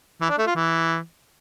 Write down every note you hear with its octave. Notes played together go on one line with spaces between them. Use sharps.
E3
D4
A3
F4
E3